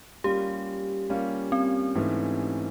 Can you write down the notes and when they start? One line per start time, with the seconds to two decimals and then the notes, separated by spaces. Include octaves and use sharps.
0.24 G3 A#3 C#4 F4 G4
1.10 G3 A#3 C#4 F4
1.52 C4
1.95 G#2 E3 A3 C#4